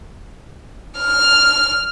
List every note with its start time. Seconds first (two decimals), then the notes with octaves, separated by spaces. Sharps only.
0.97 F6